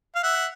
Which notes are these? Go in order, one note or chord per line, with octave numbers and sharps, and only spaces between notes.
F5
E5 F#5